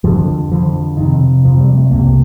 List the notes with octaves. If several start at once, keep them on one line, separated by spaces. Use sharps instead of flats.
F2 D3 F3
F2 D3 F3
F2 C3 D#3
F2 C3 F3
G3
A3
C2 C3 A#3